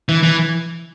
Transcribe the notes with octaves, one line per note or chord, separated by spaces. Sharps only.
E3
E3